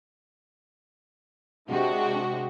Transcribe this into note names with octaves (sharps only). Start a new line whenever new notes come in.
C3 G#3 D4 F#4 G4